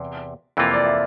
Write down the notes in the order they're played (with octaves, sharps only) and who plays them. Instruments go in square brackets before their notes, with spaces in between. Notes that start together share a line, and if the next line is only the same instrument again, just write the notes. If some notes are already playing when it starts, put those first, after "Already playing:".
Already playing: [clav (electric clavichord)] E2 C3
F2 C3 E3 A#3 F4
[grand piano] D5
E5